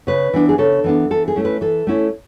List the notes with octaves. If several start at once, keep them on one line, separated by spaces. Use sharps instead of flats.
C#3 B4
E3 B3 D4
G#4
C#3 A4
E3 B3 D4
E3 A4
G#4
A3 C#4 E4
B4
E3 A4
A3 C#4 E4